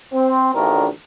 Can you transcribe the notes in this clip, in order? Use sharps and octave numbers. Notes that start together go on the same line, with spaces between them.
C4
A1 D2 D#3 D4 A#4